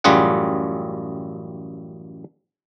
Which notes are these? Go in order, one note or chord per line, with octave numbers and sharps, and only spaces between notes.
A1 F#2 G3 F4 G#4 F#5